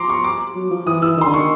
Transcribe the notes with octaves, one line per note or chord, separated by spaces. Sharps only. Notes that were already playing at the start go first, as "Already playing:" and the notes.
Already playing: F3 A#5 C6 D6
C#6
D6
F#3
F3
E3 D#6
E3 E6
D#3
D3 C6
D#3 C#6